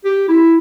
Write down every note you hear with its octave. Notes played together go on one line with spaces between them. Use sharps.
G4
E4